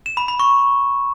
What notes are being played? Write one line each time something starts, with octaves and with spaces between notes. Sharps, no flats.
E7
B5
B5
C#6